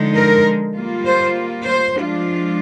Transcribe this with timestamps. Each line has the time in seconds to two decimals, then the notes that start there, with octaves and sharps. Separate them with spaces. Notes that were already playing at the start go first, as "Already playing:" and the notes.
Already playing: D3 F3 G#3 D#4
0.17 A#4
0.76 G3 A#3 F4
1.06 C5
1.65 C5
1.95 F3 G#3 D4 F4